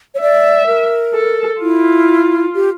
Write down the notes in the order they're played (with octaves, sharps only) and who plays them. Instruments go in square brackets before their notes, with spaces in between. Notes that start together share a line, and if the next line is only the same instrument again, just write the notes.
[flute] C#5
[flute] D5 [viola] E5
[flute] A#4
[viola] A4
[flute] E4 [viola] F4
[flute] G4